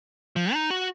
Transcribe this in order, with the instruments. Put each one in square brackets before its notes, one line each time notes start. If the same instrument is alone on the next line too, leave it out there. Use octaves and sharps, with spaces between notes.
[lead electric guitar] F3
D#4
F#4